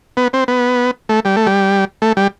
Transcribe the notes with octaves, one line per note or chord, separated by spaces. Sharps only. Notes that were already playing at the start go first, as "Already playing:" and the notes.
B3
C4
B3
A3
G3
A3
G3
A3
G3